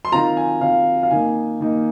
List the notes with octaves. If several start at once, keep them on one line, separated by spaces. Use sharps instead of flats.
C6
D#3 C4 F4 A#5
G#5
D#3 C4 F4 F5
F5
D#3 A#3 D#4 G#5
D#3 A#3 D#4